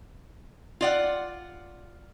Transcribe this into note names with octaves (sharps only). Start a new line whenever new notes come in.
F4 D5 F#5